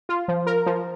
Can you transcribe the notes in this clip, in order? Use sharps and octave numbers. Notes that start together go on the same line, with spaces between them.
F4
F3
A#4
F3